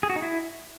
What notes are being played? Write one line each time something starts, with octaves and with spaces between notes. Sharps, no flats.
G#4
F#4
D#4
E4